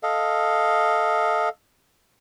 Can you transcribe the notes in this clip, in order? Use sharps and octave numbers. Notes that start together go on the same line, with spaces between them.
A4 D#5 F5